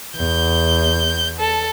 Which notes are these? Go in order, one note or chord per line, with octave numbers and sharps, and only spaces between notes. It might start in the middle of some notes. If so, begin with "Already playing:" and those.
E2 G6
A4